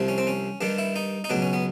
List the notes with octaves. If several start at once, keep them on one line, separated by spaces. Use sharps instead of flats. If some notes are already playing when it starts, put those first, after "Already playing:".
Already playing: C2 C3 F3
C#4
C4
C#4
G2 D#3 G3 D4
E4
D#4
D#4
C#2 B2 F#3 D4
C#4
B3